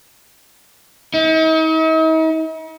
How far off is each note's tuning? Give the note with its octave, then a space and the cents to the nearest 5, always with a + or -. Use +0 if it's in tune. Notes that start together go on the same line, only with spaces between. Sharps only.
D#4 +45